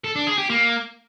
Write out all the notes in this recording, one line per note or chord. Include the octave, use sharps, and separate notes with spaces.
A4
D4
G#4
G4
A#3